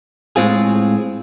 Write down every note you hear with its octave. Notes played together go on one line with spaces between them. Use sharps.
A2 G#3 C4 F4 G#4